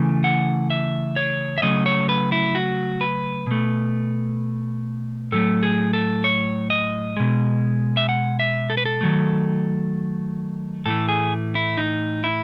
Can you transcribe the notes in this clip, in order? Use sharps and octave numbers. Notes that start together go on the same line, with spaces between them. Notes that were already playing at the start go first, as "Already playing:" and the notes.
Already playing: C#3 E3 A3
F#5
E5
C#5
E5
C#3 F#3 A3 D#5
C#5
B4
E4
F#4
B4
B2 A3
A2 F#3 A3 A4
G#4
A4
C#5
D#5
B2 G#3
E5
F#5
E5
A4
B4
A4
D#3 F#3 A3
A2 E3 A3 A4
G#4
E4
D#4
E4